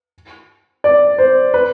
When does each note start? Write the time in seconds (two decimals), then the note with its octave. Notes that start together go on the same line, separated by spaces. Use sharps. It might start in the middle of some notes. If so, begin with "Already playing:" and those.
0.84 D5
1.18 C5
1.54 B4